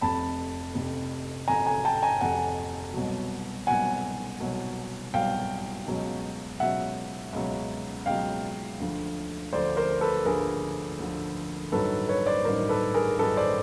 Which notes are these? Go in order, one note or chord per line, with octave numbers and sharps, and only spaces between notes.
F1 F2 C3 A5 B5
F1 F2 C3
F1 F2 C3 G#5 A#5
G#5 A#5
G5 A5
G#5 A#5
F1 F2 C3 F#5 G#5
C2 B2 F#3
C2 B2 F#3 F#5 G#5
C2 B2 F#3
C2 B2 F#3 F5 G5
C#2 B2 F#3
C#2 B2 F#3 E5 F#5
C#2 B2 F#3
C#2 B2 F#3 F5 G5
D2 D3 F3
D2 D3 F3 C5 D5
A#4 C5
A4 B4
D2 D3 F3 G#4 A#4
D2 D3 F3
A1 G2 D#3 F#3 A4 B4
B4 C#5
C5 D5
A1 G2 D#3 F#3 A#4 C5
A4 B4
G#4 A#4
A1 G2 D#3 F#3 A4 B4
C5 D5